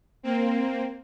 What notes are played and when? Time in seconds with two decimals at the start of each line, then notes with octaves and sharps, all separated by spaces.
0.23 A#3 C4